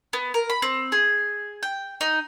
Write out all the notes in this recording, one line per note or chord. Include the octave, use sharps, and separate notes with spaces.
B3
A#4
B5
C4
G#4
G5
D#4